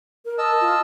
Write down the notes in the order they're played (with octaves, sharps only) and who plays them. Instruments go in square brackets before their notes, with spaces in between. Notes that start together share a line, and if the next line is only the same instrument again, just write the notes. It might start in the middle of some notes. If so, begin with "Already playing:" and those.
[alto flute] A#4
[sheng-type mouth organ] D#5 A5 E6
[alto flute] F4